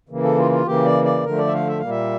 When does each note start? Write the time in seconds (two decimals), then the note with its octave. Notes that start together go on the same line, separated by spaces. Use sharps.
0.09 C#3 E3 A#3
0.23 A4
0.38 F4
0.52 F4
0.66 C#3 E3 A#3 G4
0.86 D5
1.04 D5
1.24 D3 F3 A3 A#4
1.38 D5
1.47 E5
1.53 F5
1.67 E5
1.79 A#2 G3 A#3 F5
1.89 E5